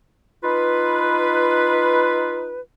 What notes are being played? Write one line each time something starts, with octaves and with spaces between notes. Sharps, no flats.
D#4 F4 B4